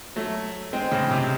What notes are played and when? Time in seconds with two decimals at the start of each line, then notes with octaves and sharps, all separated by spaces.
0.16 F#3 A3
0.73 G#3 C4
0.92 A2 C#3
1.11 C3